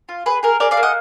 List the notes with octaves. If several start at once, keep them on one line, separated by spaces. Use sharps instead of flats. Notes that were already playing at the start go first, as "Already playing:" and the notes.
F4
G#4 B4
G#4 A#4
G#4 A#4 D5
D5 F5
A#3
D#5 F#5